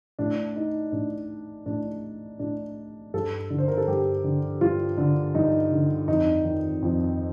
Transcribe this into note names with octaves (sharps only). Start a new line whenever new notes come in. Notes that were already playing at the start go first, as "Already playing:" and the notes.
A2 D4
D#4
A2 D4
A2 D4
A2 D4
G2 A4
D3
C5
A#4
A4
G2 G4
D3
G2 F4
D3
G2 D#4
D3
F2 D#4
D#3
F2